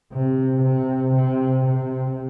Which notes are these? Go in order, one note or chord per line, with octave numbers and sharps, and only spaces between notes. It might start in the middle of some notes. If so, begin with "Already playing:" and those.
C3
C3
C3
C3